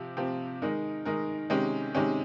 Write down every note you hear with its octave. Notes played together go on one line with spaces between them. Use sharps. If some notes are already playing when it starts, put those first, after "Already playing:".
Already playing: C3 F3 C4 G4
C3 F3 C4 G4
D#3 G#3 D#4 A#4
D#3 G#3 D#4 A#4
C3 D#3 G#3 C#4 G4
C3 D#3 G#3 C#4 G4